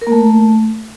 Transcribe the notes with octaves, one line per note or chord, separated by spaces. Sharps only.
A#4
A#3
A3